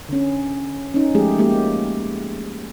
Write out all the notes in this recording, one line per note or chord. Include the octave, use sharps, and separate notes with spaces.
D3 C#4
C#4 D#4
F3 G#3 A3 G4 G#4
G#3 A#3 F#4 G4